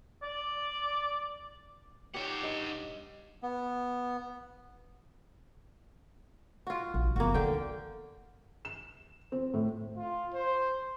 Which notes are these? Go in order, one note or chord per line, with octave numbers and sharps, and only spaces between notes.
D5
D#4 G4 C#5 D5 F#5
G2 D#5
B3
F4 F#4
A#1
F#1 A#3 B3 F#4
D3 D#3 G5
E7
C4
A2
F4
C5